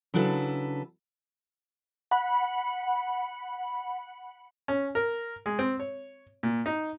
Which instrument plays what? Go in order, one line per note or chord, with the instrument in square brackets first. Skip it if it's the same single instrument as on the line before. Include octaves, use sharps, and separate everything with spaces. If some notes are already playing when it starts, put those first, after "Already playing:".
[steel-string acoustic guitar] C#3 F#3 D4 E4 A4 B4
[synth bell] F#5 B5
[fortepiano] C#4
A#4
G#3
C4
C#5
A#2
D#4